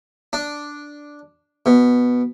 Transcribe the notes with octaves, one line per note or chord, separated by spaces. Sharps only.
D4
B2